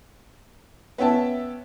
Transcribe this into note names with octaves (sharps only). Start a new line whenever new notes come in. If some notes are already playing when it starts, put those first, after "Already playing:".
B3 C#4 C#5 E5 G5 A5